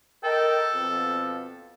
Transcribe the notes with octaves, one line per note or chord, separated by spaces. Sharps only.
A4 A#4 D#5 G5
F2 B2